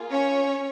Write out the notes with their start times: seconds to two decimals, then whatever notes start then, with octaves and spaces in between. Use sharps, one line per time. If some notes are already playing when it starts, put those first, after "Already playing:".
Already playing: A#3 F4 G#4
0.10 C#4 C#5